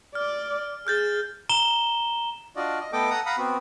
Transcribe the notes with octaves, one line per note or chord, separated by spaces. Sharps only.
D5 F6
G#4 F6 G6 A6
A#5 E7 G7
D4 F4 F#4 D5 D#5
D#5
A3 B3 A4 D#5 G5 D6
A4 F#5 A#5 D#6
F5 F#5 A#5 B5 D#6
B3 C4 F#4